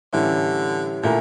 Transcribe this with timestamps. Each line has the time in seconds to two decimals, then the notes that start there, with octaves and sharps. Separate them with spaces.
0.13 A2 D3 E3 G3 C#4 E4
1.03 A#2 D3 A3 E4 A#4